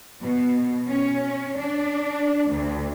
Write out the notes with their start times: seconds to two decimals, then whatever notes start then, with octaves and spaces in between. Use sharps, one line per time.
0.22 B2
0.88 C#4
1.58 D4
2.50 D2